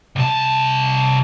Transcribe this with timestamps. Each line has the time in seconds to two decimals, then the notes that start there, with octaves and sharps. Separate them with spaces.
0.16 C2 A5